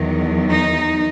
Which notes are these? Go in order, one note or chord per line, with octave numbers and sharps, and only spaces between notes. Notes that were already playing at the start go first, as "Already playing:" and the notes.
Already playing: E2 D#3 F#3
D#4